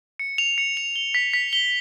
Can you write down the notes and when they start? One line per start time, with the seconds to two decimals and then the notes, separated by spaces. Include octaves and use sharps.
0.19 C#7
0.38 F7
0.58 C#7
0.77 F7
0.96 G7
1.15 B6
1.33 B6
1.53 G7